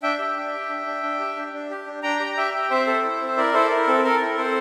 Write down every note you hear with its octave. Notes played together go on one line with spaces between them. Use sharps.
D4 E5 G5
G4
D4
G4
D4
D4
D4
G4
D4
D4
G4
D4
D4 G5 A#5
G4
G4 E5 G5
G4
C4 C5 E5
A4
E4
C4
E4 A#4 D5
E4 A4 C5
E4 A#4
C4 A4
A4 A#4
E4
C4 A4 C5